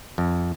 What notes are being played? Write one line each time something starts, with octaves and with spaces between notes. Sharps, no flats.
F2